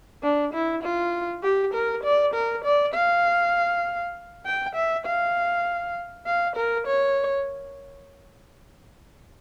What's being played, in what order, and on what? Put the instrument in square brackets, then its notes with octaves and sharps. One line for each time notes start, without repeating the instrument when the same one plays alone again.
[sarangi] D4
E4
F4
G4
A#4
D5
A#4
D5
F5
G5
E5
F5
F5
A#4
C#5